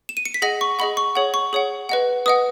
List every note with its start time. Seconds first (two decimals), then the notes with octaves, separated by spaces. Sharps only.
0.09 E7
0.17 D#7
0.25 C#7
0.34 B6
0.42 G#4 D#5 F#5 A#6
0.61 C#6
0.79 G#4 D#5 F#5 B5
0.97 C#6
1.15 G#4 C#5 F#5
1.34 C#6
1.53 G#4 C#5 F#5
1.89 B4 D#5 F#5
2.26 B4 D#5 F#5 D#6